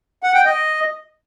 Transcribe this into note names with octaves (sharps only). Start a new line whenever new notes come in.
F#5
G5
D#5